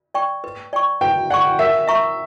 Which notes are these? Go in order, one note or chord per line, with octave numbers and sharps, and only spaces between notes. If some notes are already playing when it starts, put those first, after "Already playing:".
D5 G5 C#6
B4
D5 G5 C#6
B4 G5
D5 F#5 G5 C#6
A#4 E5
E5 A#5 C#6